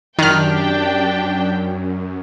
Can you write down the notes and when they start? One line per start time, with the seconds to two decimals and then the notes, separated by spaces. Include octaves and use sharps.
0.19 F#2 D#3 D4 G4 G5 F6